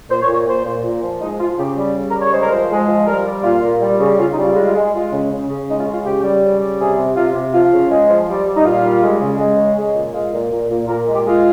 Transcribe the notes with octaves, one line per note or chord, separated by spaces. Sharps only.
A#2 C5
C#5
A#2
C#5
A#2 C5
A#2
A#2
F3
G#3 D#4
F3 F4
C#3 G4
G3
C#3
A#4
G3
C#5
G#3 C5
A#4
F3 C5
G#3
F3
G3 A#4
G3
A#2 F4
A#2
G3
C#3
C#3 F4
D#4
G3
F4
G#3 F4
F4
G#3
G#3 F4
C#3
C#3
C#3
G#3 D#4
F4
C#3
F4
C#3 G4
G3
C#3
G3
C3 G#4
C3
C3 F4
C3
F3 F4
C#3
G#3
F3
G3
G3
D#4
A#2 F4
G3
G#3
C#3
G#3
C#3
G#3
A#2
G#3 F4
A#2
A#2
A#2
A#2 A#4
G#3
G4
G#3 F4